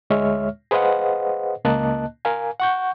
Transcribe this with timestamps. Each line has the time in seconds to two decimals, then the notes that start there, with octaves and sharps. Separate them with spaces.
0.10 D2 G#3 C#5 E5 F6
0.71 G#4 B4 C5 D#5 F5 F#5
1.65 C#2 A#3 D#5 A5 F#6
2.25 A#4 F5 G#5
2.60 F#5 C#6 G6